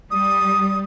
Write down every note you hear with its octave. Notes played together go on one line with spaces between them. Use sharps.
G3 D#6